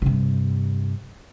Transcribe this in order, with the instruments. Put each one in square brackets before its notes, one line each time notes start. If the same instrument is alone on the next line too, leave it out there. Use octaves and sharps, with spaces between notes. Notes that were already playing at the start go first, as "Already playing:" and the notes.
[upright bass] G2 C3